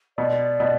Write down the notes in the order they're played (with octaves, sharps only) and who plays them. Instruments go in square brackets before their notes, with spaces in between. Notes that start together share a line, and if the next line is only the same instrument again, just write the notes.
[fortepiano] B2 [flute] D5
[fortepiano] B2